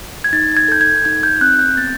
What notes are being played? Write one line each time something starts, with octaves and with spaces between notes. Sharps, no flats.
G#6
D#4 A6
G#6
A4 G6
G#6
D#4 G#6
G6
C4 F#6
G6
B3 A6